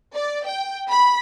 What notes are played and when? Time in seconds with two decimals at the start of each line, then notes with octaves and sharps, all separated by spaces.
0.14 D5
0.45 G5
0.89 B5